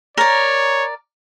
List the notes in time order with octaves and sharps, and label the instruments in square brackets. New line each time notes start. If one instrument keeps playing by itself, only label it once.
[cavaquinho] A#4 D5 [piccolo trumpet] C#5